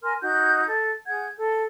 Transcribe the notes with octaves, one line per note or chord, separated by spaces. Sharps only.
A#4 G#5 C6 F6
D#4 F#4 G6
A4
G#4 F#5 G6 G#6
A4